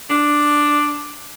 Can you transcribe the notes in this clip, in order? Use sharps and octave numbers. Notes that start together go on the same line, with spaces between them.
D4